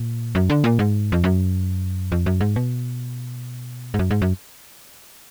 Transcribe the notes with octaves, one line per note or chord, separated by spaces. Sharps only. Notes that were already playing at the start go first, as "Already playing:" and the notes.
Already playing: A#2
F#2
D3
A#2
G#2
F2
F#2
F2
F#2
G#2
B2
G#2
F#2
G#2
F#2